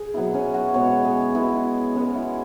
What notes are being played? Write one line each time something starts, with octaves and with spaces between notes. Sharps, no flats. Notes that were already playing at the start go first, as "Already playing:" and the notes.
Already playing: G#4
B2 F#3 B3 E4
C#4
F#4
B2 G#3 B3 C#5
G#4
B2 G#3 B3 E4
E3 G#3 B3 C#4
E4